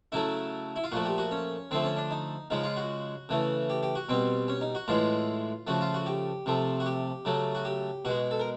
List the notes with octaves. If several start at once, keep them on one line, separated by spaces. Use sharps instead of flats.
C#3 F#3 A3 E4
E4
F4
A#2 F3 A3 F#4
G4
F#4
C#4
D3 F3 A3 C4
C#4
D4
D#4
C#3 F3 G#3 D#4
F4
F#4
C#3 E3 A3
G4
G4
F#4
B2 G3 C4
C#4
D#4
F#4
A2 E3 G#3 F4
C#3 F3 A3 F#4
F4
F#4
G4
C3 F3 A3
F#4
G4
C#3 F#3 A3
F#4
G4
B2 G#3 F#4
A4
A#4